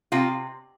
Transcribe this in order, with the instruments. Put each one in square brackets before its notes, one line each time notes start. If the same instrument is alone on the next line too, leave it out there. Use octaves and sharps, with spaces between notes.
[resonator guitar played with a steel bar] C3 F4